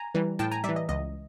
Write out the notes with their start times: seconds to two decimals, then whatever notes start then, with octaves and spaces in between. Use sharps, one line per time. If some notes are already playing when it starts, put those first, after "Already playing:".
Already playing: G#5 A#5
0.15 E3 G3
0.39 A2 G5 A5
0.52 G#5 A#5
0.64 E3 G3 D5 E5
0.76 D#5
0.89 C#2 D#5